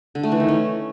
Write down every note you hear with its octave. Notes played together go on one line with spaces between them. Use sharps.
D3
A3
E3
D#3
C#4